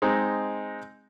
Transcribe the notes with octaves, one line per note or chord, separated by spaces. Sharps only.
G#3 C4 D#4